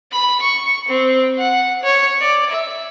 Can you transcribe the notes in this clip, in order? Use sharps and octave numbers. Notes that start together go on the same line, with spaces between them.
B5
C#6
C4
F#5
C#5
D5
E5